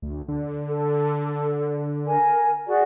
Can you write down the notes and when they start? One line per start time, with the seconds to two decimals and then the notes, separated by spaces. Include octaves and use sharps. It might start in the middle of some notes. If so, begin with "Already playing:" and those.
0.02 D2
0.28 D3
0.69 A4
2.07 A#4 G#5
2.67 F#4 G#4 D5